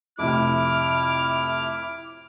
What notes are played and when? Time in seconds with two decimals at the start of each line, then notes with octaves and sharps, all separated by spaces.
0.19 F2 A2 C3 E4 D6 F6